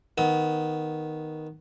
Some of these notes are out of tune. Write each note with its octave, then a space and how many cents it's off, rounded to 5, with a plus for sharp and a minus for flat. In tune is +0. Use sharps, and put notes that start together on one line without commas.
D#3 +0 B3 +0 D#6 +45